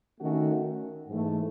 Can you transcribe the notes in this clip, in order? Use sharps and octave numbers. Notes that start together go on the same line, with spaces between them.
D#3 A3 C#4 F#4
G#2 E3 A3